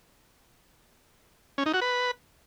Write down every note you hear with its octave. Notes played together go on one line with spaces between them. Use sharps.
C#4
D#4
F#4
B4